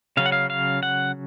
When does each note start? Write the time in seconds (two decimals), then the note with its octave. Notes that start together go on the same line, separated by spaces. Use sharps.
0.17 C#3 F#3 C#4 F5
0.26 F#5
0.32 F5
0.50 F5
0.83 F#5